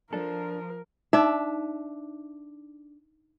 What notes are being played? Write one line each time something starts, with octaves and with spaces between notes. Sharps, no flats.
F3 D4 A4 A#4
D4 D#4 E5